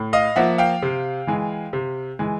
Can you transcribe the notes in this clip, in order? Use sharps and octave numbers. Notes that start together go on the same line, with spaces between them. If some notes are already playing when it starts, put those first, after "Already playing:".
Already playing: A2
D#5 F5
F3 A#3 E5 F#5
F5 G5
C3
E3 G#3
C3
E3 G#3